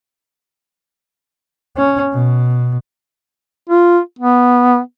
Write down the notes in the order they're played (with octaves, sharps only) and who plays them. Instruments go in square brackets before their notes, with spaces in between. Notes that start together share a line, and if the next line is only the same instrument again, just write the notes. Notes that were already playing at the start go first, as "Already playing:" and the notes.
[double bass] C#4
B2
[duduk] F4
B3